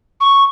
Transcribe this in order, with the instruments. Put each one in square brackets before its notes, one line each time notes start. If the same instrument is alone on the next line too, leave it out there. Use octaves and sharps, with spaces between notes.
[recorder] C#6